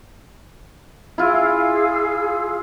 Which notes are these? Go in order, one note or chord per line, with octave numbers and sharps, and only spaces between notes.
E4 F4 G#4 F5 E6